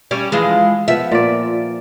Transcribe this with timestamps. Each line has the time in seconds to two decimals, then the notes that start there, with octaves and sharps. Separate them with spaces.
0.11 G3 C#4 D5
0.32 E3 F3 G#3
0.88 F3 B3 E5
1.11 A#2 D5